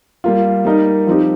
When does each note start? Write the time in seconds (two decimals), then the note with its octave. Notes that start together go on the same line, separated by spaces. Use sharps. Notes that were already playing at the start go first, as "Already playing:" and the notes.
0.24 G3 A#3 F4
0.65 G3 A#3 D#4 A#4 D#5
1.07 F3 C4 D#4 G4